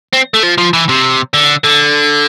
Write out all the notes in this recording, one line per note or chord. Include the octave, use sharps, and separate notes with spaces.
C4
A3
F3
F3
E3
C3
D3
D3